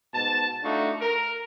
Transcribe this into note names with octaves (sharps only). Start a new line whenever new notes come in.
G#2 B2 A5
A3 D4 D#4 F4 F#4
A#4